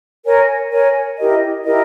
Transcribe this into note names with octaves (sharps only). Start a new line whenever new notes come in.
A#4 C#5 G#5
A#4 C#5 G#5
E4 G4 A#4 D#5
E4 G4 A#4 D#5